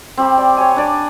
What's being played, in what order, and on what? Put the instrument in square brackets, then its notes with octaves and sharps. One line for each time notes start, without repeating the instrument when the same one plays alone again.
[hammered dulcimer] C4 G4 B5
D5
C#5 G#5
D4 D5 G#5